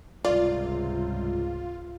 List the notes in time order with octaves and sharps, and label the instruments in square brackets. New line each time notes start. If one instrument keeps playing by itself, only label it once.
[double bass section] C#2 G#2 [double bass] C3 G3 [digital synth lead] F4 [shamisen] D5